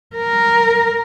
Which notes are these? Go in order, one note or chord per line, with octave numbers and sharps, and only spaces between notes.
A#4